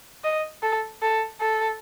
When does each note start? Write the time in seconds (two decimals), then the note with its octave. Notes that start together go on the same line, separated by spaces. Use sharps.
0.24 D#5
0.63 A4
1.02 A4
1.41 A4